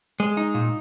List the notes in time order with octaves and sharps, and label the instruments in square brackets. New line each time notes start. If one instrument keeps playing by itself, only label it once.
[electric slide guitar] G#3
D#4
A#2